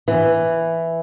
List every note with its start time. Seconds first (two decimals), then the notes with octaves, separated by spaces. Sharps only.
0.08 E3